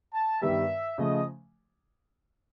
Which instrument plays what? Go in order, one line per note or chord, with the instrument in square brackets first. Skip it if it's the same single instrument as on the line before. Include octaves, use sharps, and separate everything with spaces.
[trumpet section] A5
[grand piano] G2 D#3 G3 B3 [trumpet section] E5
[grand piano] C#3 F3 A3 [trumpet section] D#5